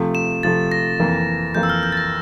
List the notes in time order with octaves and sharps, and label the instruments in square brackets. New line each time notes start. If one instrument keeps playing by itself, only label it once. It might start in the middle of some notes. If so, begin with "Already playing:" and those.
Already playing: [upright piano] C3 F3 A3
[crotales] E7
[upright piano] C3 F3 A3 [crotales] A6
[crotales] A#6
[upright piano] F2 E3 A#3
[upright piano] F2 E3 A#3 [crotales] G6
[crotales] E6
F6
G6
A6
A#6